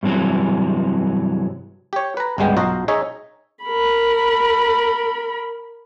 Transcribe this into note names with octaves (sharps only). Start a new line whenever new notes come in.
G2 C3 E3 F#3
G4 C#5
B4 A#5
G1 C#2 G3 G#3 B3 G5
B1 F4 F#4 C5 D#5 A#5
D#4 G#4 C#5 D#5 E5
A#4 B5